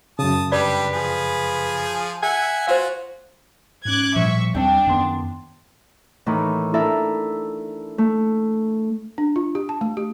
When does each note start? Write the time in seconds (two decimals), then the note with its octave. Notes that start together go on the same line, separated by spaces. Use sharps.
0.19 F#2 C#3 A5 D#6
0.52 G3 D4 G4 B4 D5 B5
0.93 F3 G#4
2.22 E5 F#5 G#5
2.67 F4 F#4 C5 F5
3.85 G#2 C#4 D6 F#6 G#6
4.16 A#2 F3 G3 E5 C#6
4.55 D#2 G3 C4 D4 G5
4.87 F#2 D#3 B3 C6
6.26 A2 D#3 E3 E4
6.74 D4 E4 A4 A#4 E5
7.98 A3
9.18 D4
9.36 F4
9.55 G4
9.69 A5
9.81 A3
9.97 G4